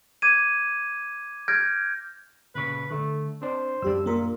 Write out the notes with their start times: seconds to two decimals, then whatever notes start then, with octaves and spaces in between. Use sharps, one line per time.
0.22 D6 G#6 D#7
1.48 F6 G6 G#6 A#6 D7
2.55 A#2 C#3 B4 C#6
2.91 D3 A3
3.42 C4 D4 C5
3.82 F#2 G3 D4 G4 E6
4.06 A#2 A#3 A#4